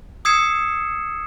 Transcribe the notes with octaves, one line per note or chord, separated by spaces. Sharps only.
D#6 E6 G#6 C7 C#7 E7